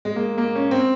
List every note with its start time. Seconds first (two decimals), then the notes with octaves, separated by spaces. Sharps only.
0.05 G#3
0.16 A#3
0.38 A#3
0.55 C#4
0.71 C4